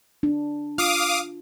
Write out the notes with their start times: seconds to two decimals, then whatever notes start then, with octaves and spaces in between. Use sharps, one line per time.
0.23 D4
0.78 F4 F5 D6 D#6